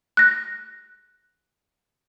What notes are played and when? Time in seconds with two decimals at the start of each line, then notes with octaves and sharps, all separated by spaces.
0.17 F#6 A#6